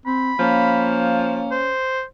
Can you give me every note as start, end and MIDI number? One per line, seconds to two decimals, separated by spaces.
0.06 0.33 60
0.06 0.96 83
0.39 1.47 53
0.39 1.58 58
0.39 1.71 61
1.51 2.03 72